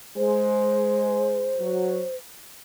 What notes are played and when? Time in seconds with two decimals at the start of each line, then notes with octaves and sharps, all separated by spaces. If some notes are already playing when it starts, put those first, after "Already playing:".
0.16 G#3 C5
1.58 F#3